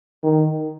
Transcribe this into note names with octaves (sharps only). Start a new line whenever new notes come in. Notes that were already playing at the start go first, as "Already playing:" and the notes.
D#3